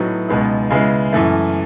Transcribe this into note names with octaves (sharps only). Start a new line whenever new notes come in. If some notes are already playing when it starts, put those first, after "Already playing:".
Already playing: A2 F#3 B3 D#4
C#2 B2 G#3 B3 D#4
C#3 G#3 B3 E4
F#2 E3 A3